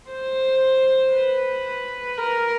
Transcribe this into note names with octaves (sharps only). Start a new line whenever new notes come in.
C5
B4
A#4